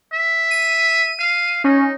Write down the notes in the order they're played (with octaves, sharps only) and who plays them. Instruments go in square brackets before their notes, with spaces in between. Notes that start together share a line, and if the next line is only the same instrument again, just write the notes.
[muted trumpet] E5
[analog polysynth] D#7
[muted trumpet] F5
[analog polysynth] C#4 [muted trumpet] D#4